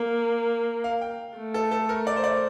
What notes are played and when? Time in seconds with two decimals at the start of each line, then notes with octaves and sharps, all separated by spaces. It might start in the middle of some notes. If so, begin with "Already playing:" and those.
Already playing: A#3 F5
0.84 F5
1.01 G5
1.37 A3
1.54 A4
1.71 A4
1.89 A#4
2.07 D5
2.16 C5
2.24 D5